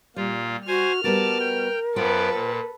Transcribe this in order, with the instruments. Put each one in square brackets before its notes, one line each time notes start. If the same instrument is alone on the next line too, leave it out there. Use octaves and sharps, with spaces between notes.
[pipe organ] A#2 F4 [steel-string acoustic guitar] G3
[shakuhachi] F#4 [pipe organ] C5 G#5 [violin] F6
[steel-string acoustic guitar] G3 B3 F#4 [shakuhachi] A#4 [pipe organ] D5 A5
[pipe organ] G5
[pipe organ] F#2 B3 D5 [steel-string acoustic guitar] F4 C5 G5 [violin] A4 B4
[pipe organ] A#2